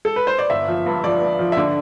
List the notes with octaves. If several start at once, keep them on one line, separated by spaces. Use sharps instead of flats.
A4
B4
C5
D5
G1 E5
F3
G2
F3 D5
G2
F3
E5
D3 D5